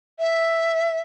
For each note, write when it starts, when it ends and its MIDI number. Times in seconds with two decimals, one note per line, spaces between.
0.19 1.02 76